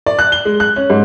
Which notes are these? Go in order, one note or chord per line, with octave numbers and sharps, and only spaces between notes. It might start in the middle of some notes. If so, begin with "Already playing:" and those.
D5
F#6
G7
G#3
F#6
C#4
G#2